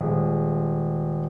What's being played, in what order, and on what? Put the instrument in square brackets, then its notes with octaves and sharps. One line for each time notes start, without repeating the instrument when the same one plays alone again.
[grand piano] D#1 G#3